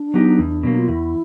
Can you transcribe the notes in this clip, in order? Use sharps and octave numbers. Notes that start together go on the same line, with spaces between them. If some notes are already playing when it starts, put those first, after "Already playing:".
Already playing: D4
F#3 B3 D#4 G4
E2
B2 F#3 A#3
F4
E2 E4